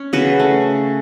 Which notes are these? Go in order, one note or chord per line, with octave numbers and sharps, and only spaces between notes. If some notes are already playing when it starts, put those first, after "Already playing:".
Already playing: C#4
C#3 F#4 B4
A3